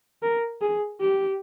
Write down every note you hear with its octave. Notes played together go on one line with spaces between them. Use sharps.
A#4
G#4
G4